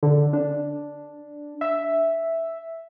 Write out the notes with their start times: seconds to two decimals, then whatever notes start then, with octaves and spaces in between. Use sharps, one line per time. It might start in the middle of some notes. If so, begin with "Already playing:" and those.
0.03 D3
0.33 D4
1.61 E5